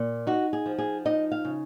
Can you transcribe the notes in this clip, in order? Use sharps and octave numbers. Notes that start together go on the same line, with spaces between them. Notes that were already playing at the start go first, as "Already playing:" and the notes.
Already playing: A#2
D#4 F#4
G#4
F3
G#4
D#4 D#5
F5
C#3